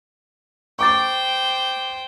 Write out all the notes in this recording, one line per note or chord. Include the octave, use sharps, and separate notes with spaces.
C5 G5 C#6 D6 A6